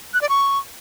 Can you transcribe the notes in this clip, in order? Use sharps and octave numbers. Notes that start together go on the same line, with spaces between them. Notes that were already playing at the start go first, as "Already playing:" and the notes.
F#6
D5
C#6